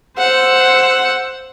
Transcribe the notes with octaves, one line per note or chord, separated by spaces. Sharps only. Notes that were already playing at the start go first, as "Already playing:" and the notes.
C5 F#5 E6